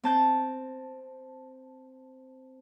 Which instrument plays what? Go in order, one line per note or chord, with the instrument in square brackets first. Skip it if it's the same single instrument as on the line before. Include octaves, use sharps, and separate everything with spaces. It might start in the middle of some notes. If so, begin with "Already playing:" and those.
[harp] C4 A5 G6